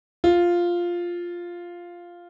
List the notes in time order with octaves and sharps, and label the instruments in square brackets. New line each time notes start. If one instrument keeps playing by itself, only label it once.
[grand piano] F4